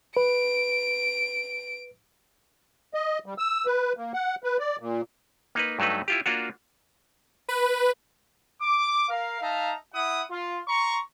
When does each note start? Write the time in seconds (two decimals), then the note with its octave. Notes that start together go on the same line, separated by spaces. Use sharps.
0.17 B4 D7
2.94 D#5
3.26 G3
3.38 E6
3.66 B4
3.97 A#3
4.14 F#5
4.44 B4
4.59 D5
4.79 A#2
5.55 A#3 D#4 B4
5.79 G2 F#3 A3 D#4 B4
6.08 E4 F4 G4
6.26 A#3 D4 F4 F#4
7.48 B4
8.61 D6
9.09 A#4 F5
9.41 D#4 E5 F5 A5 A#5
9.94 E4 E5 F#5 D#6
10.31 F4
10.67 A#5 C6 C#6